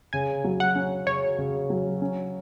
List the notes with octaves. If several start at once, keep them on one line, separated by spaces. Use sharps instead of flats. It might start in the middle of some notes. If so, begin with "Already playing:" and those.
C#3 G#5
F#3
F#5
C#4
C#3 C#5
C#3
F#3
C#4